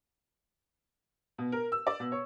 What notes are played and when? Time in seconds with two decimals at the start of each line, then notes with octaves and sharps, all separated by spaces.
1.38 B2
1.52 A#4
1.72 E6
1.87 D5
2.00 B2
2.12 C#5